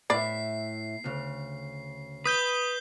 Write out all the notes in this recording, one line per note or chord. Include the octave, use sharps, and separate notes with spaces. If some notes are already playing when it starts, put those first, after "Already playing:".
A2 B4 D5 E5 C7
D2 C#3
B4 D#6 G6 G7